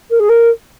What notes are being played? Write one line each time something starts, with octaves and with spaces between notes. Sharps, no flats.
A#4
G#4
A#4